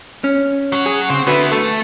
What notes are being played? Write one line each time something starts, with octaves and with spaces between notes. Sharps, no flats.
C#4
F#3 F#4
G#4
C#3 C4
D3 B3 E4 F#4 B4
A3 A4